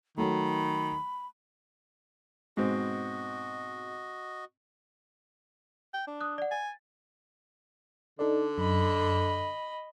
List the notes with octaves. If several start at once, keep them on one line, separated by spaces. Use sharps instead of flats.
D#3 F#3 A3 B5
G#2 B2 C4 F#4 D#5
G5
D4
D#6 F#6
D5 F#5
G#5 A6
D3 D#4 A4 D5
F#2 D#5 B5